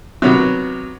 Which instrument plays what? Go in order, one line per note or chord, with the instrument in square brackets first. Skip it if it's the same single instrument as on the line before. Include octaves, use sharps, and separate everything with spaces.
[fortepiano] C3 D#3 F#3 B3